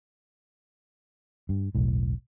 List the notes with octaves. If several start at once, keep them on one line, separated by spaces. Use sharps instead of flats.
G2
E1 B1 A2